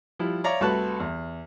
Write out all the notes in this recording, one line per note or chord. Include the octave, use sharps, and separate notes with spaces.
F3 G3 E4
C#5 D5 E5 F5 A#5 D6
C2 A3 F#4 B4 A5 F#6
E2